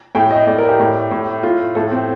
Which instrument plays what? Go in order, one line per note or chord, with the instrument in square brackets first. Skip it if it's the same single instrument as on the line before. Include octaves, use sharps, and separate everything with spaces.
[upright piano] A2 G5
D#5
A2 D5
A#4
G4
A2
A2
A2 F4
A2 A4
C4